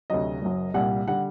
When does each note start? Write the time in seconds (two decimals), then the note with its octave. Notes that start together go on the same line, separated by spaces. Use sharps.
0.10 D2 C3 F#3 D#5
0.42 F#1 F#2 F#3
0.74 C2 A#2 G3 F#5
1.08 D3 G3 F#5